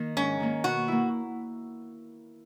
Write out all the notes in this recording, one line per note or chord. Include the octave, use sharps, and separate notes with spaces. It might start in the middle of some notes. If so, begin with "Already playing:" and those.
Already playing: D#3 A#3
G#2 C#4
D#3 A#3
B2 F#4
A#3 E4